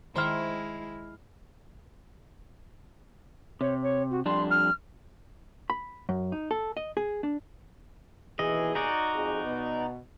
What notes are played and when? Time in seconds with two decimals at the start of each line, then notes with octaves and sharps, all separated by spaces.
0.16 D#3 G#3 E4 C5 E5 C6 F6
3.61 C3 C#5
3.82 C#5
4.10 F#4
4.26 F2 G3 D4 C6
4.50 F6
5.70 B5
6.09 F#2
6.32 D#4
6.51 A4
6.77 D#5
6.97 G#4
7.23 D4
8.39 D#2 B2 E3 G#4 D#5
8.75 D#4 F#4 D5
9.14 F2 G#4
9.44 B2 B3